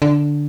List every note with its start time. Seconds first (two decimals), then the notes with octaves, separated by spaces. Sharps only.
0.02 D3